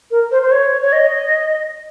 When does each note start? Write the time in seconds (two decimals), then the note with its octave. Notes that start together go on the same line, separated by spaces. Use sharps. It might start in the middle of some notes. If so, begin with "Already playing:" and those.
0.11 A#4
0.31 C5
0.42 C5
0.52 C#5
0.82 C#5
0.93 D#5